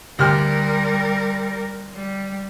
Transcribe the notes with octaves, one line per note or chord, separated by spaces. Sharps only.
D2 G3 G4 A#4 F6
G3